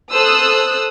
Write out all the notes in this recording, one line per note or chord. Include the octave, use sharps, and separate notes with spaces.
A4 C5 D#6 E6 F#6